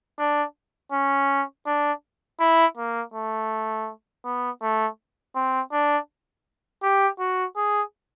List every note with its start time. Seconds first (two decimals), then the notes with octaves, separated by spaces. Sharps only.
0.19 D4
0.92 C#4
1.66 D4
2.40 E4
2.77 A#3
3.14 A3
4.25 B3
4.62 A3
5.35 C4
5.72 D4
6.83 G4
7.20 F#4
7.56 G#4